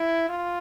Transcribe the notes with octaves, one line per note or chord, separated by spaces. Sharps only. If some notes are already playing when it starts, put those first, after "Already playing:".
Already playing: E4
F4